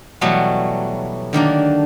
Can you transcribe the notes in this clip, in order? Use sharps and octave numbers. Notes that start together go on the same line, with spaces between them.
B2 E3 F#3 G3 A3 B3
D3 D#3 A#3 D4